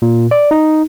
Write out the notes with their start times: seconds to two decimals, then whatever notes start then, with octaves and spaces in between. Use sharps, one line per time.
0.02 A#2
0.31 D5
0.51 D#4